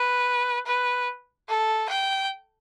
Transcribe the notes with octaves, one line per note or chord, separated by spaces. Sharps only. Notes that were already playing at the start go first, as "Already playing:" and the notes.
Already playing: B4
B4
A4
G5